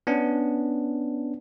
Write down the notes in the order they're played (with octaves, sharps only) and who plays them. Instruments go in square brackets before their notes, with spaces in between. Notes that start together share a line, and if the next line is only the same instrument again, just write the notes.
[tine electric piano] B3 C#4 D4